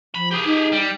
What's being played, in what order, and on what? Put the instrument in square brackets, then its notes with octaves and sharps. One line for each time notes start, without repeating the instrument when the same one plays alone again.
[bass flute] F3 [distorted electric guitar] B5
[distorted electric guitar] G4 G#4
[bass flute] D#4
[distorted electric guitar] G3